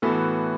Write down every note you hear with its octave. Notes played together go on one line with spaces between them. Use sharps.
A2 E3 B3 F#4 A4